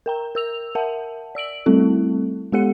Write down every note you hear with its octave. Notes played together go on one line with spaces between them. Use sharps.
A#4 G5 A#5
A#4 E6 F7
A#4 E5 F#5 A5
D5 E6 D7 F#7
G3 A3 C4 E4 A4
G#3 B3 G4 A4 F#5 C#7